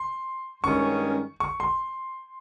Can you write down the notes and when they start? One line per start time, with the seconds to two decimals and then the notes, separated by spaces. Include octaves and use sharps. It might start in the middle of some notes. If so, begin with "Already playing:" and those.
Already playing: C6
0.64 G2 D#3 G#3 C#4 C#6
1.40 C#6
1.60 C6